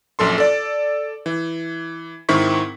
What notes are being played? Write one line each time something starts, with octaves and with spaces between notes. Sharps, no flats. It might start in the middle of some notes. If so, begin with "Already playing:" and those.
A#1 F#2 A4 C6
A4 D5
E3
G#2 D#3 C4 E4 C#6 B6